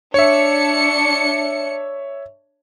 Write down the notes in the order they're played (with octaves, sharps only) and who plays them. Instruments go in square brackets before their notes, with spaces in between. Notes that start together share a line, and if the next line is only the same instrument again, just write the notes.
[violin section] D4 C#7 [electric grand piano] C#5 E5